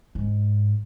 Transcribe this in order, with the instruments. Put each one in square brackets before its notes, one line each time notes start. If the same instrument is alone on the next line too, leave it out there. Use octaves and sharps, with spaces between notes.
[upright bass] G#2